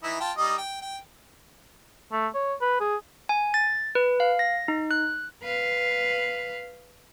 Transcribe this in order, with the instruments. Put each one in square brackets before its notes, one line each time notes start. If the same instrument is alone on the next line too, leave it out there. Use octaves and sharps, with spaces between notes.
[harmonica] E3 D#4 E4
F4 G5 A5
G3 D#4 D#5
G5
G5
[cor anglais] A3
C#5
B4
G#4
[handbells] G#5
A6
B4
F5
A#6
D#4
F#6
[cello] B4 F5